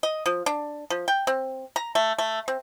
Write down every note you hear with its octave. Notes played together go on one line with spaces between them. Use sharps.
D#5
F3
D4
F3
G5
C4
A#5
A3
A3
C4